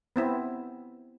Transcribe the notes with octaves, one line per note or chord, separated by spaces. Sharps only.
B3 C4 E4